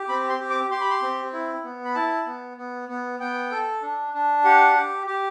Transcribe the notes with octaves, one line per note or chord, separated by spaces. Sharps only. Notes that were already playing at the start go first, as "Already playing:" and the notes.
Already playing: G4
C4 B5
C6
G4
D6
G4 C6
B5
C6
C4
E4
B3
B5
E4 A5
B3
B3
B3
B3 G5
A4
D4
D4
G4 F#5
G4
G4